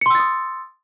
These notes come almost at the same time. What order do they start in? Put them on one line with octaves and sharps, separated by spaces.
C#7 C6 E6 A6 D#6